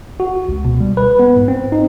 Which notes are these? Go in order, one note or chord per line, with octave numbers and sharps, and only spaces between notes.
F#4
C#2
B2
G3
B4
B3
G#2
C4
D#4